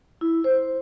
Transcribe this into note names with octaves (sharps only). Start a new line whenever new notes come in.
E4
C5